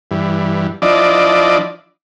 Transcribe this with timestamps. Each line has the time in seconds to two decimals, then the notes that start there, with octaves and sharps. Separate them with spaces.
0.11 G2 E3
0.82 F3 D4 E4 D5 D#5